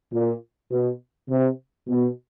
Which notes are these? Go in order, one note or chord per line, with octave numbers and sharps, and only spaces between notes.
A#2
B2
C3
B2